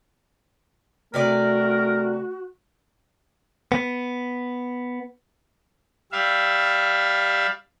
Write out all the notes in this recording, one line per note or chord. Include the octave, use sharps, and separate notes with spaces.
C3 A3 F#4 A#4 B4 D5
B3
G3 E5 F5